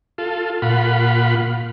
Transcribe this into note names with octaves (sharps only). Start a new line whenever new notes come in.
F4 A4
A#2 F4 F#5 B5